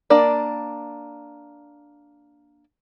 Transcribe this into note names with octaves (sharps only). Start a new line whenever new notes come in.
A#3 D4 D5